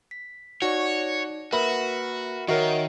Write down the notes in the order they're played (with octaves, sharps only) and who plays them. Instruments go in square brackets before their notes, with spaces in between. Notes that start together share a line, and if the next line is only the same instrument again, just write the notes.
[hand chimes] B6
[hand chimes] D#4 D5 [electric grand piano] F#4 [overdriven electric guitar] C#5
[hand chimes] A#3 B4 [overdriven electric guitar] F#4 [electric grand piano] A#4 E5 B5
[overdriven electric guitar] D#3 [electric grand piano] F#4 A#4 C#5 [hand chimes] D#5 E5 C7